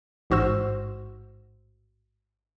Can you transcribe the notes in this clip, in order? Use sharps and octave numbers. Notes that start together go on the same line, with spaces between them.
A1 G#2 F#4 C5 E6